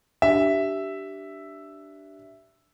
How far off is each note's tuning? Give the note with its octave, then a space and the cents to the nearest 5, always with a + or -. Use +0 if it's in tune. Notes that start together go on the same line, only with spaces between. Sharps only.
D4 +0 G4 -20 E5 +0